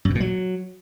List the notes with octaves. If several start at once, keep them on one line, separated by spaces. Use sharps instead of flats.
F#2
B2
A#2
F#3